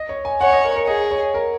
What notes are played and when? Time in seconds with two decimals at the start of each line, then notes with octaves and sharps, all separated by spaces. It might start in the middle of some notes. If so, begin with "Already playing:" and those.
Already playing: D#5
0.09 C#5
0.25 G#5
0.41 C#5 F#5
0.53 D#5
0.64 A#4
0.76 A#4
0.87 G#4 D#5
1.11 C#5
1.34 A#4